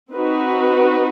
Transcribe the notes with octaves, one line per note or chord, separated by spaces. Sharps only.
C4 D#4 F#4 B4